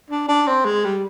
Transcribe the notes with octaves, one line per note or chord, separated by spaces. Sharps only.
D4
D4
C4
G#3
G3